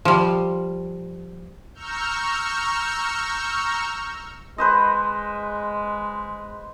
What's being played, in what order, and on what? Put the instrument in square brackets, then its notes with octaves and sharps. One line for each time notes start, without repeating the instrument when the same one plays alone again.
[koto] F3 G3
[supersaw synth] A#5 C#6 E6 F6 G6
[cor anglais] G#3 [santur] B4 C5 D#5